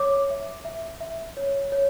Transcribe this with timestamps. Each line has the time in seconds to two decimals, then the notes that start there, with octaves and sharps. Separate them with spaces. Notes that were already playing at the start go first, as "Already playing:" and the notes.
Already playing: C#5 D6
0.30 E5
0.65 E5
1.01 E5
1.37 C#5
1.72 C#5